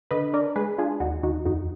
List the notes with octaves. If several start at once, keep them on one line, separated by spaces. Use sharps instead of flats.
D3 B4 D#5
D4 A#4 D5
G#3 G#4 B4
D4 F4 G#4
D#2 D#4 F#4
D#2 D#4 F#4
F2 D#4 F#4